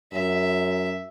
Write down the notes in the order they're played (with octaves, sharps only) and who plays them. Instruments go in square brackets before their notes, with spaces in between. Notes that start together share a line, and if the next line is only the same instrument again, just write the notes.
[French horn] F#2 [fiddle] E5